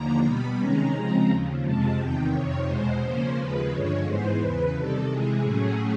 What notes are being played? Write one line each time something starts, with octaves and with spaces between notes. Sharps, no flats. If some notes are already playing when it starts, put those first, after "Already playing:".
Already playing: D#2 D3 F3 A#3 A#5
B2 G3 B3 B5
C3 D#3 G#3 C#4 A#5
C#3 F3 G#3 C4
D#2 C#3 F3
F2 C3 F3 G#3 A5
E2 C3 D#3 G5
F2 C3 D#3 C#5
E2 B2 G#3 C5
C#3 F3 A#3 C#4
D#2 C#3 F3 G#3 B4
G2 D3 F3 G#3 C#5
G#2 E3 G#3 B3 C5
E2 C#3 E3 B4
C3 D#3 G3 A4
C3 E3 G#3 G#4
A2 F#3 A3 C#4 G#4